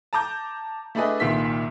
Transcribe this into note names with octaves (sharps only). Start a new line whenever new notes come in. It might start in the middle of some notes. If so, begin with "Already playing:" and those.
A5 A#5 D6 G6
A3 D4 E4 G#4 B4 D#5
C2 A#2 D#3 E5 B6